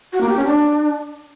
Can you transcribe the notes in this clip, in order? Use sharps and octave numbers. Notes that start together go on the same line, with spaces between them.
F#4
A#3
G4
C#4
D4